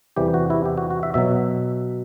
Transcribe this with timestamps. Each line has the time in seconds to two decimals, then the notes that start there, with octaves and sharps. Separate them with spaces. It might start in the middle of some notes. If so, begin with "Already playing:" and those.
0.16 E2 C3 E3 G3 G4
0.34 F#4
0.50 E4
0.66 G4
0.77 F#4
0.91 F#4
1.03 E5
1.14 B2 F#3 E5